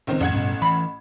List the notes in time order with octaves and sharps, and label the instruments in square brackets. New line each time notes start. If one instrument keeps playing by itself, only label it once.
[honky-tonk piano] C#2 D#3 C4
[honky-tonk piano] A1 F#5 G#6 [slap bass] F2
[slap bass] G2 B2 C#4
[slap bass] E3 [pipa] B5